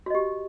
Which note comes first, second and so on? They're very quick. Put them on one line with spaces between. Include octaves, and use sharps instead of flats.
F#4 D#5 G4